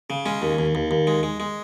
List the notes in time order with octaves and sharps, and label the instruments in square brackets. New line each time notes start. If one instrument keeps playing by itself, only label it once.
[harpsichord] C#3
G#3 C#4
D#2
D#2
D#2
D#2
G#3
G#3
G#3